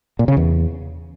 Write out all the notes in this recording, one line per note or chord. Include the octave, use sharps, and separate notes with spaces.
A#2
C#3
E2